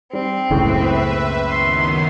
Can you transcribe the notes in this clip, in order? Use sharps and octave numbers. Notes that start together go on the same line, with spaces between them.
G3 C4
F#1 C#2 A2 C#3 B4 E5 G5
D#3 F#3 B3 C6